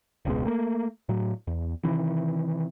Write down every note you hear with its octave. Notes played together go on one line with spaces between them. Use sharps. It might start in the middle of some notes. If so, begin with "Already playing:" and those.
E1 C#2 B2 G#3
A3 A#3
A2 F#3
E2
C3 D#3 E3